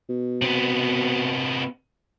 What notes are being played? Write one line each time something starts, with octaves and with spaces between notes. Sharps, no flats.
B2
C3 B3